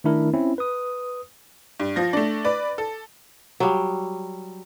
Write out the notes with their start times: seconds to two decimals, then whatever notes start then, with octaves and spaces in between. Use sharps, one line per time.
0.04 D#3 A3 D4 E4 A#4
0.33 C4 C#4 E4
0.58 B4 D#6
1.80 G2
1.96 F3 A#6
2.13 A3 D4
2.45 B4 D5
2.78 A4
3.60 F#3 G3